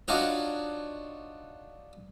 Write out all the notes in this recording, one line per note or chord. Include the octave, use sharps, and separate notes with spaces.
D4 D#4 F4 F#4 C#5